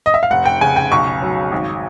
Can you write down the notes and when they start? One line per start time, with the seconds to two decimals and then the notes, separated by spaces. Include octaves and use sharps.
0.06 D#5
0.14 E5
0.23 F5
0.30 F1 F#5
0.45 G5
0.61 C#3 G#5
0.76 G5
0.92 B1 C#6
1.22 F#3
1.52 G#1